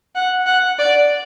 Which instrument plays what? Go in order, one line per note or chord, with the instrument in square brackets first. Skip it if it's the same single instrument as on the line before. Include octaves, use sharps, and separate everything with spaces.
[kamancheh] F#5
F#5
D5